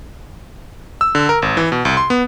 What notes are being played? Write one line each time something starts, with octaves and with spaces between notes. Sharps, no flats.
E6
D3
A#4
G#1
E3
B2
C2
C6
B3